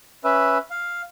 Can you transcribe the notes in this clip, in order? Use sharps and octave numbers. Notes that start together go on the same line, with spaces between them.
C#4 B4 E5
F5